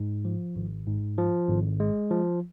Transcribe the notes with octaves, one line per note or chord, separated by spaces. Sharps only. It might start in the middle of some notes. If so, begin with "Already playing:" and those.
Already playing: G#2
F3
G#1
G#2
F3
G#1
G#3
F3